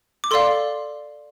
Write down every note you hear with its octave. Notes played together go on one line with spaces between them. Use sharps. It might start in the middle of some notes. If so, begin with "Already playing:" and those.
D6
A4 D5 F5 C6